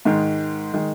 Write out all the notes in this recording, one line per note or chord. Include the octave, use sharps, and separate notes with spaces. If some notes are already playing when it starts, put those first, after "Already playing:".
G#2 D#3 G#3
D#3 G#3